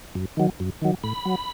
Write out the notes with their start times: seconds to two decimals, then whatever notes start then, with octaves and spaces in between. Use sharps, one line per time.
0.15 F#2
0.37 D#3 F#3
0.60 F#2
0.82 D#3 F#3
1.04 A2 B5
1.25 F#3